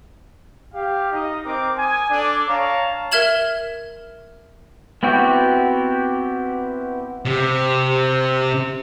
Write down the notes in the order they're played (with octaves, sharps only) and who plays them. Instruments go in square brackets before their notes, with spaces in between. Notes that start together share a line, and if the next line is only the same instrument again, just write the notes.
[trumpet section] G4 F5
D#4 D#5
C4 A#4 D6
G#5 D#6
D4 A4 D5 D6
C#5 F5 A5 A#5
[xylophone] A#4 E5 F6 G#6 E7 F#7
[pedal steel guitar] B3 C4 E4 F#4 G4
[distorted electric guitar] C3